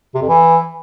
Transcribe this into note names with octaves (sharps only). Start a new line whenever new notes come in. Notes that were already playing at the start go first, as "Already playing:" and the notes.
C3
F2
E3